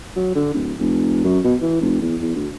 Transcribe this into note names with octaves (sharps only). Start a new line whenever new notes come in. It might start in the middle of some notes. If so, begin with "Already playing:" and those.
F#3
D3
D1
F1
F#2
B2
E3
F1
E2
E2
D2